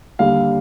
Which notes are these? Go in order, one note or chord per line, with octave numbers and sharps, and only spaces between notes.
D#2 D3 G3 F5